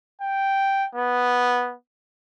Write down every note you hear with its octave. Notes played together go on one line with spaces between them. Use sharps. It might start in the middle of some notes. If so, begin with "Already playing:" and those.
G5
B3